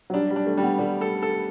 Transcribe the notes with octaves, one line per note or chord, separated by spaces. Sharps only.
F#3
G3 D4
G3
D4
A3
G3
B3
G3 A3
A4
A4